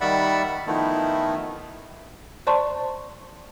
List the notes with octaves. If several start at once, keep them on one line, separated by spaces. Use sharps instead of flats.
D#3 G3 D5 E5 F#5 B5
D#3 F3 A3 B3 D#4 E4
C5 D5 A5 C6 C#6